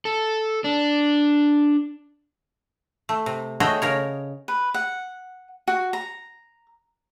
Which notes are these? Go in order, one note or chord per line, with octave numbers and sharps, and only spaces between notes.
A4
D4
A3
C3
A3 F#4 G#4 C#5 D#5 G5
C#3 A#4 C#5
B4
F#5
F#4
A#5